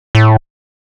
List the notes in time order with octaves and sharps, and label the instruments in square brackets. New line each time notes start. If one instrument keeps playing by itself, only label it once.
[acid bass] A2